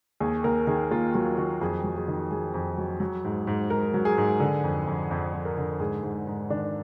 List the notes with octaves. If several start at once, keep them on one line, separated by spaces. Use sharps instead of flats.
D#2 G#4
D#2 A#4
D#3 G#4
D#2 F4
F#3 F4
D#3 F#4
F2 G#4
F#3
G#4
D#3
F#3 G#4
F2
F#3
F#3
G#2
G#2
G#2 A#4
F#3
G#4
G#2
D3
F2
F2
F2
F2
A#4
D3
G#2 G#4
G#2 G#4
G#2
D#3 D4